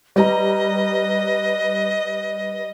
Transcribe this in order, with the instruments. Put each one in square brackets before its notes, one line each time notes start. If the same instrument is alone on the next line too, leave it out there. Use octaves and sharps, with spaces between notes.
[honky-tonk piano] G3 A#5 [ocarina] B4 [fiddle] D#5